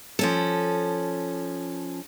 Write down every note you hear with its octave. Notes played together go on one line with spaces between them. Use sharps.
F3 C#4 A4